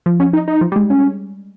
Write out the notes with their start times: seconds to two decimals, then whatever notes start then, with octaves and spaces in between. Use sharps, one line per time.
0.06 F3
0.20 C#4
0.33 D#4
0.48 D#4
0.61 F3
0.72 G3
0.76 G#3
0.90 C#4